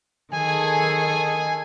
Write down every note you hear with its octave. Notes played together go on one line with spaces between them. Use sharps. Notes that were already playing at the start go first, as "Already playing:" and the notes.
D#3 G#4 A4 G#5